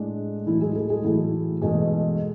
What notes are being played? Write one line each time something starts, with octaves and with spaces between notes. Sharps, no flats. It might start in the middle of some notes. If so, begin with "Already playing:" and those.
Already playing: A2 G#3 D4
A2 E3 F#3 A3 E4
G#3 G#4
A3 A4
G#3 G#4
A2 E3 F#3 A3 E4
E2 B2 G#3 A3 G#4